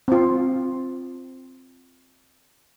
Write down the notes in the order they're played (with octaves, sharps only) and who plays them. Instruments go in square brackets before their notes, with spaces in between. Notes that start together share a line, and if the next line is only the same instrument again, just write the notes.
[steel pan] C4 F4